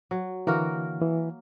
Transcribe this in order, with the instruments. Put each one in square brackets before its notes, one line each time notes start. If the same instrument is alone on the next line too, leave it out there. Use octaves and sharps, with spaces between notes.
[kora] F#3
[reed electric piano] D3 E3 [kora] A#3 F#4 A#4
[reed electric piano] E3